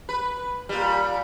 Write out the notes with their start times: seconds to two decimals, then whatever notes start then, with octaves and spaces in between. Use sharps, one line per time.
0.09 B4
0.69 A#2 G3